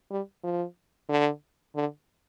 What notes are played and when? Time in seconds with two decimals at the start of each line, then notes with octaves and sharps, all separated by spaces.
0.10 G3
0.44 F3
1.09 D3
1.76 D3